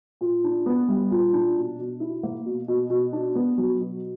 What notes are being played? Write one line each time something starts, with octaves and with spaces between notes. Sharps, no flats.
A#2
D4
B3
G3
A#2
D4
B2
B2
E4
A#3
B2
B2
B2
D4
B3
F#3
B2